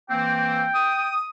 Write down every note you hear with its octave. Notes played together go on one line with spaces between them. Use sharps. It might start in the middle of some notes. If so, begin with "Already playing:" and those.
E3 A#3 C4 G5
D#6